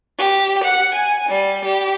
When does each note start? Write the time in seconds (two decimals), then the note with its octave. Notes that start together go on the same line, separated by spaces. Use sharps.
0.18 G4
0.62 F#5
0.93 G#5
1.28 G3
1.64 G4